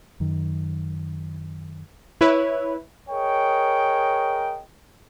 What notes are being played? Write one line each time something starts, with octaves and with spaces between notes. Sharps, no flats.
F#2 D#3
E4 B4 C#5
G#4 A#4 C#5 D#5 G5